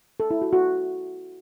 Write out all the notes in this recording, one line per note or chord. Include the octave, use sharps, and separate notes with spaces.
A4
E4
F#4
F#4